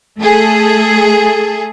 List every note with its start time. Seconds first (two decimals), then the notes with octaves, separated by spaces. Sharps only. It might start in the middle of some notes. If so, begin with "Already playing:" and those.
0.19 A3 G#4 A4